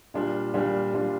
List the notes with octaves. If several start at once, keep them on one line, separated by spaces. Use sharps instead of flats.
A#2 G3 D4 F4
A#2 G3 D4 F4
A#2 G3 D4 F4